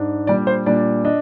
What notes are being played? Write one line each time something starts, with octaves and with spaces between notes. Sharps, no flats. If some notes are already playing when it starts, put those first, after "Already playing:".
Already playing: G#2 D4
A#2 G3 D4 D5
C5
A#2 G3 D4 D5
D4 D#5